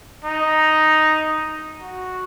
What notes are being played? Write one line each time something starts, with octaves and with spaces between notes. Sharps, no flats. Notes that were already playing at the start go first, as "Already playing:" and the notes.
D#4
F#4